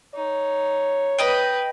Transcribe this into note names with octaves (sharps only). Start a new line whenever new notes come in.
D#4 C#5
B4 D#5 G5